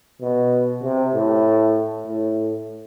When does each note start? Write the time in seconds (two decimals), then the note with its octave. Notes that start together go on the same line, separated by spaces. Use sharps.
0.21 B2
0.83 C3
1.14 A2
2.07 A2